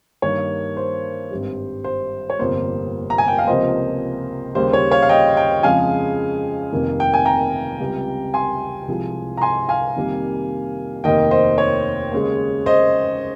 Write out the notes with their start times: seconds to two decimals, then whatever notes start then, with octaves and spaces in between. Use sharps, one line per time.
0.22 G2 D#3 A#3 C#5
0.77 C5
1.31 G#1 G2 G3
1.84 C5
2.30 C#5
2.39 G1 F2 C3 G3 A#3 C5
3.10 A#5
3.18 G#5
3.28 G5
3.38 F5
3.47 C#2 C3 F3 A#3 C5 D#5
4.55 D#2 C#3 G3 C5
4.73 C#5
4.91 C#5 F5
5.02 F5
5.09 D#5 G5
5.36 D#5 G5
5.63 F2 C#3 F3 G#3 F5 G#5
6.72 F1 F2 C3 D#3 A#3
7.00 G5
7.14 G#5
7.25 G5 A#5
7.80 C#2 C3 G3
8.34 G#5 C6
8.88 C2 C3 F3 G#3
9.37 A#5
9.42 G#5 C6
9.69 F5 G#5
9.96 F2 C3 D#3 G3 A#3
11.04 F1 D#2 D#3 A#3 D#5 G5
11.31 C5 D#5
11.58 C#5
12.12 D#2 C#3 G#3
12.66 C5 D#5